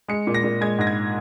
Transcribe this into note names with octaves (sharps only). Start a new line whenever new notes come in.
G#3 C#7
A#2
A#6
A#2
G#3 G#6
G#2 A#6
G#6